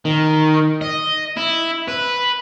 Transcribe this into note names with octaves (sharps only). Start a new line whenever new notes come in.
D#3
D#5
E4
B4